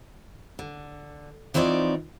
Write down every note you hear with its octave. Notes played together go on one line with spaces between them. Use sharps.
D3
E3 F3 C4 D#4 C#5 D5